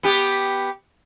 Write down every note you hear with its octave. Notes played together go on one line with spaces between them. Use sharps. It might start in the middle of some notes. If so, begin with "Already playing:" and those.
B3 G4